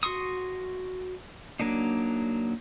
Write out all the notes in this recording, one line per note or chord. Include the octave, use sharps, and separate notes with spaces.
F#4 C6 C#6 D#6
F#3 A#3 D4 D#4